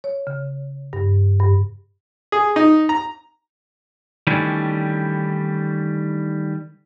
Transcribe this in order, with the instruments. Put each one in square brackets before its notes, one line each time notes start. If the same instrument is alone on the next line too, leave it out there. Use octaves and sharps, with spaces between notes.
[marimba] C#5
C#3
G2
G2
[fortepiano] G#4
D#4
A#5
[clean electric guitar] D#3 E3 G3 A3 C#4 D4